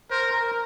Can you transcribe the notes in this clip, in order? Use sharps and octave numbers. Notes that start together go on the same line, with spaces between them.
A#4 C5
A#4